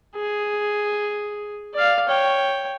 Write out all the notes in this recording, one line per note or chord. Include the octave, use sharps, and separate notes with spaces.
G#4
D5 F5
C#5 G5